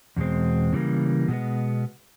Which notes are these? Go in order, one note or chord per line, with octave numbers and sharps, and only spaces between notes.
E2 B2 G#3 C4
C#3 E3 G3 A#3
B2 G#3 B3